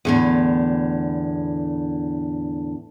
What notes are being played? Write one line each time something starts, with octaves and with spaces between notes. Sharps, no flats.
E2 A2 D3